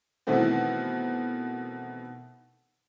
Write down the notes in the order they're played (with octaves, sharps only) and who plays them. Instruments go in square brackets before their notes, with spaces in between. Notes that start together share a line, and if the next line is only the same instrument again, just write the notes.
[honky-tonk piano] B2 D#3 E3 A3 B3 C4